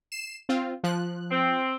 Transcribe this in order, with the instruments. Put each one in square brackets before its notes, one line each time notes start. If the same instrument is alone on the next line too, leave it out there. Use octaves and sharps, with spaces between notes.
[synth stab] C7 E7
C4 F4
F3 F#6
[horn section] C4